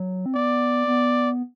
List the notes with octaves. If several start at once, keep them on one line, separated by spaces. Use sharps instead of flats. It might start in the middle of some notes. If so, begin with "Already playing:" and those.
Already playing: F#3
C4
B3 D5
B3